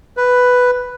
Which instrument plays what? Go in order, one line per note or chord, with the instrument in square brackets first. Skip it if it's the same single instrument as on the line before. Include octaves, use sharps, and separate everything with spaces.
[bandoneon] B4